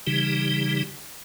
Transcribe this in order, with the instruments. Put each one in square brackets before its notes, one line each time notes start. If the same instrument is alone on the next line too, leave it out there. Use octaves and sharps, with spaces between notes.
[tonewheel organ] C#3 E3 G3 D#4 G4